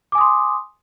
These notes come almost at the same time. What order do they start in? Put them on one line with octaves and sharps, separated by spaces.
D6 G#5 D#6 C6